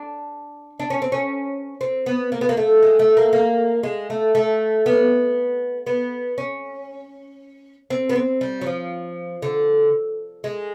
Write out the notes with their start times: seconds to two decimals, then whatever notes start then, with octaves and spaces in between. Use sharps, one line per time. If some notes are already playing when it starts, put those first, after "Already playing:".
Already playing: D4
0.80 D4
0.90 C#4
1.02 C4
1.12 C#4
1.81 C4
2.06 B3
2.32 A#3
2.41 B3
2.49 A#3
2.57 A3
2.83 G#3
2.99 A3
3.17 A#3
3.33 A#3
3.83 G#3
4.10 A3
4.35 A3
4.86 B3
5.87 B3
6.38 C#4
7.90 C4
8.09 B3
8.15 C4
8.41 G3
8.61 F#3
8.66 F3
9.42 D3
10.44 G#3